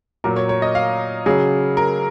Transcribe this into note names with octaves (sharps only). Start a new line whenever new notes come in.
A#2 F#3 A#4
C#5
C#5
D#5
F5
C#3 F#3 G#4
A#4